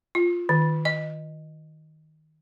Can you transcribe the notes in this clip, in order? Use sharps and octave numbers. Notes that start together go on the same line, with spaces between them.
F4
D#3
D#5